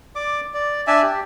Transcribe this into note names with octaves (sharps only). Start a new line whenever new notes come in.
D5 D6
D5
D4 D5 E5 G#5
G4